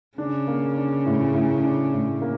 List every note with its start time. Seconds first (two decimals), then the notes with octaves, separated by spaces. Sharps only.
0.18 C#3 D4
0.48 A#3
0.76 D4
1.06 A2
1.35 A2
1.63 D4
1.93 A2
2.22 A#3